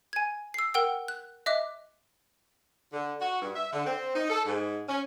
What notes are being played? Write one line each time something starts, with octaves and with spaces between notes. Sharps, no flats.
G#5 G#6
E6 C7
A#4 F#5 G5 E6
F#6
D#5 E5 D6 F#6
D3
F#4
G2
E5
D3
C4
D#4
A4
G#2
C#4